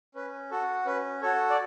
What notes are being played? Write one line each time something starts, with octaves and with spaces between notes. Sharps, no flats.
C#4 B4
F#4 A4
C#4 B4
F#4 A4 C#5
D5